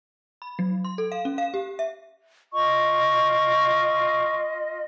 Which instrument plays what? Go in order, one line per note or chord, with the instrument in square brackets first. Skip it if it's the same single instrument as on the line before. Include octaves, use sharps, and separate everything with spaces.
[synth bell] B5
F#3
C6
A4
F5
C#4
F5
G4
E5
[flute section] F4 D#5 [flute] C#6